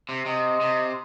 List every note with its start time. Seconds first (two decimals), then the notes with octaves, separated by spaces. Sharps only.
0.09 C3
0.26 C3 D#5
0.61 C3